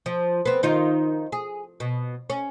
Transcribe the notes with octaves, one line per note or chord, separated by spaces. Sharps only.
F3
B3 C4
D#3 D#4 F4
G#4
B2
C#4